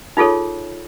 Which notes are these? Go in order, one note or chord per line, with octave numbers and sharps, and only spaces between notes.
D#4 F4 G#4 A4 C#5